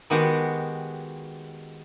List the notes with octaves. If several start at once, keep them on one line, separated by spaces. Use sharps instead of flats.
D#3 G#3 B3 F#4 G4